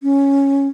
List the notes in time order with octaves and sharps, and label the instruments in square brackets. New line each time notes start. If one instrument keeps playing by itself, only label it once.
[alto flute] C#4